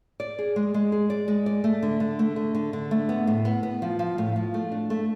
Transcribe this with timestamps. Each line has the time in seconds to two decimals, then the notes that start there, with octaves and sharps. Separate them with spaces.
0.20 D5
0.39 G#4
0.56 G#3
0.74 G#3
0.92 G#4
1.10 D5
1.28 G#3
1.46 D5
1.64 A3
1.83 D3
2.00 D3
2.19 A3
2.36 D3
2.55 D3
2.73 D3
2.91 A3
3.09 B3
3.27 A2
3.45 B3
3.63 B3
3.82 F3
3.99 F3
4.18 A2
4.36 F3
4.54 A3
4.72 D4
4.90 A3